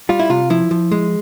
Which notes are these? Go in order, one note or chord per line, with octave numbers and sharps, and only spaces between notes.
G3 F4
E4
C3 F4
F3 E4
F3
G#3